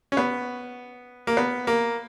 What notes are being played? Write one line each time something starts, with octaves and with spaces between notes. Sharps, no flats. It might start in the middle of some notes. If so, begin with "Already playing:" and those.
C#4
B3
A#3
B3
A#3